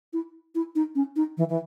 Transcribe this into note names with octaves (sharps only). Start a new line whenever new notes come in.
E4
E4
D#4
C#4
D#4
E3
E3